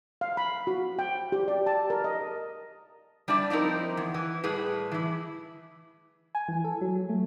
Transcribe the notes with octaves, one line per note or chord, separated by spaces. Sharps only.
F5
B5
F#4
G5
G4
D5
A5
A#4
D#5
G3 D4 D5 E5
F3 C4 D#4 E4 A#4
E2
E3
A2 G3 G#4 B4
E3 E4
G#5
E3
A4
F#3
F#3
A3